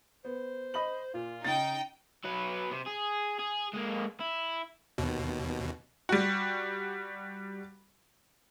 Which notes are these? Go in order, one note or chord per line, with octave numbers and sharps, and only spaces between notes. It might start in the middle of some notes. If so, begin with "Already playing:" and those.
B3 C5
D#5 B5 F#7
A#2 F4
C#3 D#4 G5 A6
F#3 B4
C3
G#4
G#4
G#3 A#3
E4
D#2 B2
G3 F#4